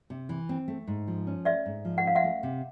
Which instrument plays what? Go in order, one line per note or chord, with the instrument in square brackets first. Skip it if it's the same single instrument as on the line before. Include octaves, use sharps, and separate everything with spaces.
[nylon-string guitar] C3
E3
C4
A3
G#2
F3
C#4
[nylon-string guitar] A3 [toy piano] D5 E5
[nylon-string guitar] G#2
F3
[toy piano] F#5
[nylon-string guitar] C#4 [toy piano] F5
[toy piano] E5 F#5
[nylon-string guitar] A3
C3